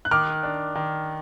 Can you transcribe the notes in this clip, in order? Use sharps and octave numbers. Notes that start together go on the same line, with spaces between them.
F#6
D#3 D6 F6
D4
D#3